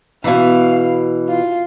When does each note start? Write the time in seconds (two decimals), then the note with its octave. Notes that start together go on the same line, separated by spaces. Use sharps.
0.24 B2 E3 F5
1.28 F4